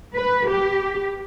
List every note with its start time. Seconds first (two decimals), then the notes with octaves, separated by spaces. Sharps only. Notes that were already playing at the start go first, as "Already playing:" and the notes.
0.15 B4
0.49 G4